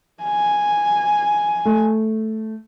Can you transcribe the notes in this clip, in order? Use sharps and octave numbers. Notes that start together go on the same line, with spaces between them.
G#5
A3